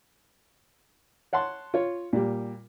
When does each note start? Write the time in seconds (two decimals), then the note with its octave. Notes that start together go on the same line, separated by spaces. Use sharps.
1.33 C#5 F#5 A5 C6
1.74 F4 C#5
2.13 A#2 G3